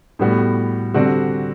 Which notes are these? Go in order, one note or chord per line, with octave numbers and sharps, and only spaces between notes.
A2 G3 B3 F#4
D3 G3 C4 F#4